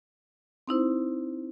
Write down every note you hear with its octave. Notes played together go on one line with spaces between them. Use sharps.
C4 D#4 E4 C5